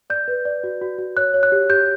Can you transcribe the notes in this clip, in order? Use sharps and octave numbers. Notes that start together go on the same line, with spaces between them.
D5 G6
B4
D5
F#4
F#4
F#4
C#5 F#6
C#5
F#6
G4
G4 G6